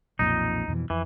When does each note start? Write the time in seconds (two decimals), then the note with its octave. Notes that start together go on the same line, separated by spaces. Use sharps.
0.19 B1 F2 A#2 D#4
0.68 F2 B2 E3
0.90 F2 E3